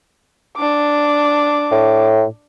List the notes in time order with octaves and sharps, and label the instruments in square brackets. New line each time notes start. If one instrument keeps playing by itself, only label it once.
[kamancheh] D4 D6
[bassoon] A2